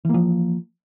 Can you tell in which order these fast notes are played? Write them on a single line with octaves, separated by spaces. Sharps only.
E3 A#3 F3